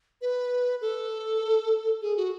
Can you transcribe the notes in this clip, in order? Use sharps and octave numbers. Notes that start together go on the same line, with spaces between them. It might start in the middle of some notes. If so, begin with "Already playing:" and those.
B4
A4
G#4
F#4